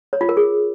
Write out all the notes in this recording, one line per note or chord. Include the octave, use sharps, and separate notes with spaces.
C#5
F4
A#4
G#4